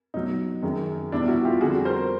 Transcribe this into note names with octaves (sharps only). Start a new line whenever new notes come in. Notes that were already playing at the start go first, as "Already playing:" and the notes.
B2 F#3 D#4
F#2 D#3 G#3
E2 B2 G3 D4 E4
E4 F#4
F4 G4
F2 D3 G3 F#4 G#4
A#4 C5